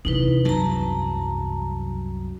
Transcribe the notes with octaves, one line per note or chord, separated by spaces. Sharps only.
E2 C3 D#4 E4 B4
C2 F#2 F#3 A5 A#5